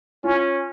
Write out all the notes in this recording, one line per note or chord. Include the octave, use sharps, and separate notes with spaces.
C#4 F4